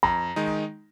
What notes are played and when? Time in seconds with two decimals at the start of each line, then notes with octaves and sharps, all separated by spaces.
0.03 F2 A#5
0.36 D#3 G#3 D#4